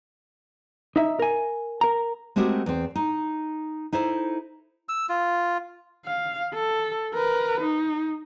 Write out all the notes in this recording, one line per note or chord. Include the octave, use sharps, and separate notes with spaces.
D#4 E5
A#4 G#5
A#4 A#5
G#3 A3 C4 F#4 G4 A#4
E2 C4
D#4
D#4 E4 A4 C5
E6
F4
F5
A4
A#4 B4
D#4